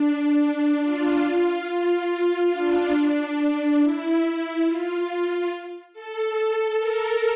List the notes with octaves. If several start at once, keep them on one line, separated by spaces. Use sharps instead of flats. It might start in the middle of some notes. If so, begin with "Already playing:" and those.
Already playing: D4
D4
F4
F4
D4
E4
F4
A4
A#4